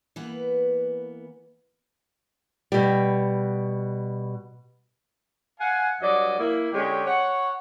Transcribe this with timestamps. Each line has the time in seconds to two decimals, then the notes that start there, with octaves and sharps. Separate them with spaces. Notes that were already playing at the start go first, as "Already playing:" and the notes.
0.16 E3 A#3 B3 B4
2.72 B2 G3
5.60 F5 F#5 G#5
6.02 G2 F#3 D5 D#5
6.38 A#3 E4
6.73 D3 G#3 C#4 G4
7.06 C#5 F#5